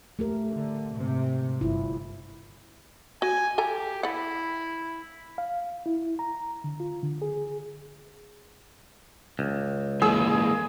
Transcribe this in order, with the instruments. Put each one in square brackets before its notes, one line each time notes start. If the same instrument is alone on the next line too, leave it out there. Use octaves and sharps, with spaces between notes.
[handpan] A3 G4 A#4
[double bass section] D3
G#2 C3
[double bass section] G1 [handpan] E4 F4
[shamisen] F#4 [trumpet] G#5
[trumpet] G4 [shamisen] A4 G#5 A#5
[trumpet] E4 [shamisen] D5 F#5
[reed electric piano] F5
E4
A#5
D3
F4
D3
G#4
[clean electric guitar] C#2
[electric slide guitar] E3 G#3 A#3 [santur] G#4 E6